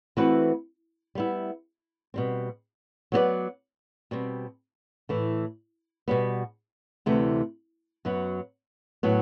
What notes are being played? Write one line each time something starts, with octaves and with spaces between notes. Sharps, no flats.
E3 A3 C4 F#4 B4
G3 B3 E4
B2 G3 C4
F#3 B3 F#4 B4 D5
B2 G3 C4
A2 E3 A3
B2 G3 B3
D2 C3 E3 A3
F#2 F#3 B3 F#4
A2 F#3 B3